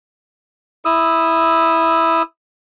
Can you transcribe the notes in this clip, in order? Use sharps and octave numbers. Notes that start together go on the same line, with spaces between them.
E4 D#6 E6